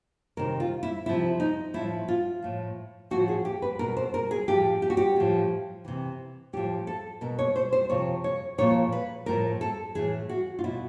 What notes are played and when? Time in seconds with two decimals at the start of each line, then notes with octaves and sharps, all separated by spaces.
0.37 C3 D#3 A#4
0.60 F4
0.83 E4
1.06 C3 F3 E4
1.40 D#4
1.74 A2 F3 E4
2.08 F4
2.42 A2 F3
3.11 A2 F3 F#4
3.28 G#4
3.45 G4
3.62 B4
3.79 B2 A#4
3.97 C5
4.14 A#4
4.31 G#4
4.48 A2 F3 G4
4.82 G4
4.90 F#4
4.97 G4
5.16 A2 F3
5.85 C3 E3
6.53 A2 F3 G4
6.87 A4
7.21 B2 A#4
7.39 C#5
7.56 C5
7.73 C5
7.90 C3 F3 C#5
8.24 C#5
8.58 A#2 F3 C#5
8.92 B4
9.26 A2 F3 A#4
9.61 A4
9.95 A2 E3 G#4
10.29 F#4
10.59 F4
10.64 B2 E4